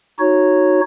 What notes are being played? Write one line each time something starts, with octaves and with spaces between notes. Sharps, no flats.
D#4 F#4 C#5